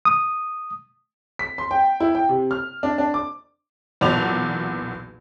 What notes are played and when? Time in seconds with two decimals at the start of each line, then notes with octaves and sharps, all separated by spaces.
0.05 D#6
1.39 B6
1.58 C6
1.71 G5
2.00 E4
2.15 G5
2.29 C3
2.51 F6
2.83 D4
2.98 D4
3.14 D6
4.01 B1 E2 A#2 F#4 D5 F7